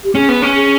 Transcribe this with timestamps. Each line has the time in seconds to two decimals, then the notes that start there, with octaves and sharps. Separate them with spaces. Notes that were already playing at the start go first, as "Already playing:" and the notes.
0.04 G4
0.15 C#4 G#4
0.29 B3
0.42 C#4
0.55 G#4